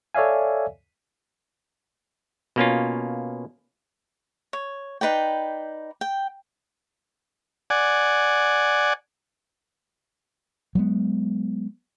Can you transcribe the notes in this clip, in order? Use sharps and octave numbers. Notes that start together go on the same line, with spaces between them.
A4 C#5 D5 E5 F5 G#5
B2 A#3 C#4 F4
C#5
D#4 B4 D5 G5
G5
D5 F#5 G#5
F#3 G#3 B3